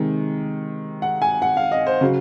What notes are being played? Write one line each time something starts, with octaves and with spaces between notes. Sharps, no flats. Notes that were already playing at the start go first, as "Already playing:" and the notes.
Already playing: C3 D#3 G#3
F#5
G#5
F#5
F5
D#5
C5
C#3 F#3